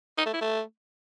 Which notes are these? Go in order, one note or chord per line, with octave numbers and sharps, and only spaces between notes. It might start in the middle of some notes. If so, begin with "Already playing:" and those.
D#4
A3
E4
A3